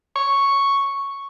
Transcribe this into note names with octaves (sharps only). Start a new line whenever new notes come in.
C#6